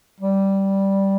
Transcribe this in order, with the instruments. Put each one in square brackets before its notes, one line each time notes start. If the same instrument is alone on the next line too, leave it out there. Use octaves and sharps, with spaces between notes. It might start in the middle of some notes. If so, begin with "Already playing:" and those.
[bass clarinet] G3